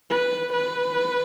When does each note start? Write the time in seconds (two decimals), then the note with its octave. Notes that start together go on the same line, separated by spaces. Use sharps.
0.10 B4
0.53 B4